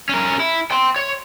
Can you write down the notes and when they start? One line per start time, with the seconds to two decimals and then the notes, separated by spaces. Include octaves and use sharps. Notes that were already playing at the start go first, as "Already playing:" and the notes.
0.09 C#4 A#4
0.40 E4
0.71 G5 C6
0.96 C#5